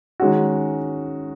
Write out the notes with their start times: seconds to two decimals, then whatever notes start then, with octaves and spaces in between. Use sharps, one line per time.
0.20 D#3 G#3 C#4 F#4